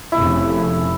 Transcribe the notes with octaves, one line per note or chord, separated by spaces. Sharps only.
F1 C#3 A3 E4